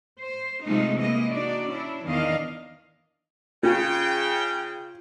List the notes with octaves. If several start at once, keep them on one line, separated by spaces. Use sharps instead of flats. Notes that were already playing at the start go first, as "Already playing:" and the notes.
C5
C3 F3 G#3 A3 D#4
E3 G#3 A#3 D#5
D4 D#4 F#4 D5
C#4 D4 E4
E2 D#3 E3 D4 D#5 F5
C#3 F4 G5